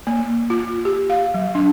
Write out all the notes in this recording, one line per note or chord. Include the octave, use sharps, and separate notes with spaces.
A#3
F4
G4
F5
F#3
D4